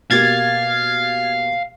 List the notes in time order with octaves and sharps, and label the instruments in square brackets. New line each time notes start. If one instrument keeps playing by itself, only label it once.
[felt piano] B2 A#3 G4 [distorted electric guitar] F5 [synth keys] G#6 A6